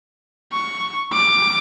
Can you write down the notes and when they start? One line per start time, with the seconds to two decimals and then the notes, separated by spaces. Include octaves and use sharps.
0.52 C#6
1.12 D6